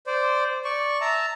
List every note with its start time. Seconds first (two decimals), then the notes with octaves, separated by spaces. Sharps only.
0.07 C5 D5
0.65 D5 C#6
1.01 E5 A5 A#5